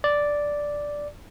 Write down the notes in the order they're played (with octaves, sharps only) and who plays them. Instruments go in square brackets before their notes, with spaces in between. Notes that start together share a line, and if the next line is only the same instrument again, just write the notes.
[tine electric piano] D5